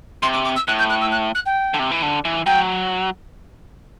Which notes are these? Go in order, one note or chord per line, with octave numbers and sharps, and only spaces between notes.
C3 C6
D6
D6
E6
A2 F#6
G6
F#6
E6
F#6
F#6
G5
D3
C3
E3
D3
E3
F#3 G5